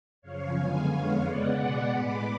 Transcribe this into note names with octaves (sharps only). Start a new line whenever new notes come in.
F#2 C#3 F3 C#5 F5
F#2 D3 G#3 B3 F5 G#5
F2 D3 G#3 B3 C#5 F5
C#3 G#3 B3 D5 F#5
B2 G#3 B3
A2 G#3 B3 B5 D6